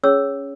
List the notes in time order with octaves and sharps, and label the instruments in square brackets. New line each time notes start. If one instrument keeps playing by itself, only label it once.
[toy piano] C#4 G#4 C#5 E6